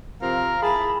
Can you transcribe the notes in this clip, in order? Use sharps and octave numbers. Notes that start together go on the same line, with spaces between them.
C3 F3 C4 A#4 F5
E4 G#4 A5 B5